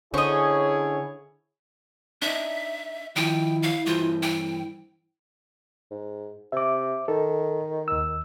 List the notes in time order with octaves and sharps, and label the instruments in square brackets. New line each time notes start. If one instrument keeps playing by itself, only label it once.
[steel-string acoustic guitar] D3 C#4 C5 [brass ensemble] E4 G#4 C#5 [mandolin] D#5 C#6
[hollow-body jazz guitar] D4 D#4 [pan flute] E5
[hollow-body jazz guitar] D#3 F3 [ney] E4 [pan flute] G5
[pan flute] F5
[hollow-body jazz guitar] G2 E3 C5 [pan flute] F4
[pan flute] G5
[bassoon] G#2
[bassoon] C3 [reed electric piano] E5 D6
[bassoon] D#3 [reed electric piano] A4
[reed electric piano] D#2 E6